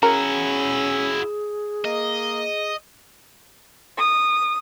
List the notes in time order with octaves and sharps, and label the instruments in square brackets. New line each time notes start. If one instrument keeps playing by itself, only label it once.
[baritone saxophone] C#4 [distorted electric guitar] E4 F#4 [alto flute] G#4 [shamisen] A#4
[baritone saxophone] A#3 [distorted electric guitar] D#5
[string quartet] D#6